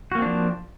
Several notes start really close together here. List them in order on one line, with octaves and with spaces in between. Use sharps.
F#4 A#3 C4 D4 F3